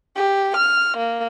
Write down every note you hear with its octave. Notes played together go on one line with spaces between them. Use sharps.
G4
F6
A#3